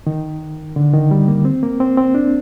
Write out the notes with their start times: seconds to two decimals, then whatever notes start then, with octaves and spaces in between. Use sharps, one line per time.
0.07 D#3
0.76 D3
0.94 D#3
1.11 G3
1.28 A#3
1.45 C4
1.63 A#3
1.80 C4
1.97 C4
2.15 D4